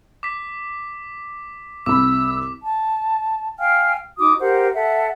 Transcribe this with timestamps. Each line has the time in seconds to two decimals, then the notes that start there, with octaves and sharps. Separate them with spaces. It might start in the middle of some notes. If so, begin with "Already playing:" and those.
0.23 D6 B6
1.86 C2 B5 D6 E6
2.64 A5
3.59 F5 G5 G#5 F6
4.18 D#4 F#4 D6 D#6
4.40 G4 A#4 C5 F#5
4.75 A4 E5 F#5